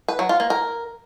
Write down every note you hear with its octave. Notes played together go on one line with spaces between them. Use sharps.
B4
F#3
F4
A#3
A#4